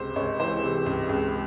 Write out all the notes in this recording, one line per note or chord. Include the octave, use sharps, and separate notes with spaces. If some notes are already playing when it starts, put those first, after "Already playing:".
Already playing: C#2 C3 C5
C#2 C#5
E3 C5
C3
C#2
C#2